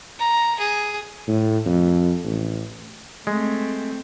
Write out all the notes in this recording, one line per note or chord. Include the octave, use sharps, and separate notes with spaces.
A#5
G#4
A2
F2
A1
G#3 A3 C4